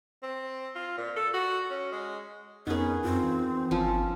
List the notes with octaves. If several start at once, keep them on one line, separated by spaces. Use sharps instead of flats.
C4
F4
A#2
A4
F#4
C#4
G#3
F2 B3 C#4 D#4 G#4 A#4
F#2 C4 F4
E3
G1 F3 C#4